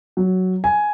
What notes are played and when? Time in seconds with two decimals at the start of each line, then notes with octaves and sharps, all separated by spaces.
0.17 F#3
0.64 G#5